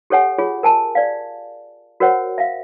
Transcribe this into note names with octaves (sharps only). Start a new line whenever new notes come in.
G4 A4 C#5 F#5 G#5
F4 G#4 C#5
A#4 G#5 A5
D5 F5
F#4 A#4 C5 C#5 F#5
E5 F5